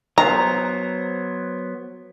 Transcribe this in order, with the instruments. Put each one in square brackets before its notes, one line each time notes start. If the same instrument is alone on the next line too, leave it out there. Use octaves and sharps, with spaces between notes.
[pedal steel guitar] F#3 B3 C5 [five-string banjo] A#5